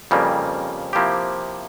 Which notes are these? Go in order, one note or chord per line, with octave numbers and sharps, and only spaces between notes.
F2 C#3 G3 A#3
C3 F3 A#3 E4 G4